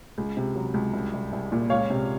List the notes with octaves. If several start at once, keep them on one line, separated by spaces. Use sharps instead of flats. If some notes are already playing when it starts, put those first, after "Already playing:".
C#2
C3
F#3
C#2
C2
C2
C2
A#2
C#2 C#5 F5
C3